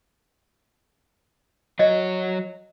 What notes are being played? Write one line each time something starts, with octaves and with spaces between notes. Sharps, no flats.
F#3 C#5 D#5